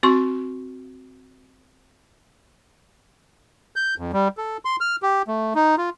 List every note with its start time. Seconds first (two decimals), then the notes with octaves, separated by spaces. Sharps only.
0.03 C4 F#4 C6 C#6
3.76 G6
3.98 F2
4.13 G3
4.38 A4
4.65 C6
4.81 F6
5.03 G4
5.28 A3
5.55 D#4
5.78 F4